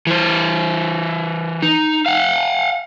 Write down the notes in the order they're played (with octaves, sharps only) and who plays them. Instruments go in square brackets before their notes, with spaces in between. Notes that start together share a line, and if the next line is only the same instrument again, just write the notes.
[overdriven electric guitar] E3 C5
D#4
F5 F#5